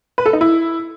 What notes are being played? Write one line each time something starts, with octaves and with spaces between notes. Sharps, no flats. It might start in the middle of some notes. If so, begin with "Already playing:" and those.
B4
A4
D#4
E4